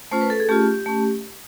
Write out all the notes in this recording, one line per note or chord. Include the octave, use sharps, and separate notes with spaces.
A3 C#4 F4 C5
B4
A4
G#4
A3 C#4 F4 G4
A3 C#4